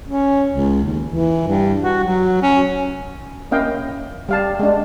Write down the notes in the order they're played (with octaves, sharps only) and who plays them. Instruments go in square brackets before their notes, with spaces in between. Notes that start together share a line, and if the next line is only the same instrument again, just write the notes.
[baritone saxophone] C#4
C#2
D#2
E3
G2
F#4
F#3
C#4
[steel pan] A#3 C#4 E4 D#5 F5 G5
G3 F5 A5
G#3 D4